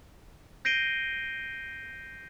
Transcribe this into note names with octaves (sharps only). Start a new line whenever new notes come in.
G6 A#6 C7 D7 D#7 G7